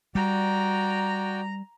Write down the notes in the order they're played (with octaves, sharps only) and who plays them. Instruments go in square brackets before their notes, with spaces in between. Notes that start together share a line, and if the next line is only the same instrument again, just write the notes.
[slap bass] G3 [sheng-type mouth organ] F#4 D5 G5 [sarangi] A#5